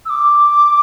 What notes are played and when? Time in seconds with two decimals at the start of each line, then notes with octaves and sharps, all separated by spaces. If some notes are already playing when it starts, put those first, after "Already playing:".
0.05 E6
0.09 D6